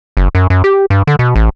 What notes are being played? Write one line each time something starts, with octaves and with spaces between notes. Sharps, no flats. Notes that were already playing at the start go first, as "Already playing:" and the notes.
F#1
F#2
F#2
G4
G2
D3
B2
A1